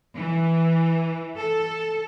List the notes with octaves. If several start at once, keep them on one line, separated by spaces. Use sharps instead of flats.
E3
A4